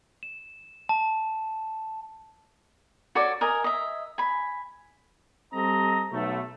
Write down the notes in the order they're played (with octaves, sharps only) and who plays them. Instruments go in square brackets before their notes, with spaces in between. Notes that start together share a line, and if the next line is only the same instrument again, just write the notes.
[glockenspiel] E7
A5
[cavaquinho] F#4 A4 C#5 D5
A#4 D#5 G#5
D#5 E5
G#5 B5
[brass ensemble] G3 C4 A4 D#5 A#5
B1 A3